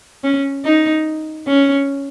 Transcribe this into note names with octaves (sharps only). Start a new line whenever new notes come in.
C#4
D#4
C#4